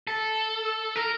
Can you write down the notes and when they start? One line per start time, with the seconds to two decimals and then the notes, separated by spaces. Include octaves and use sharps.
0.07 A4
0.96 A#4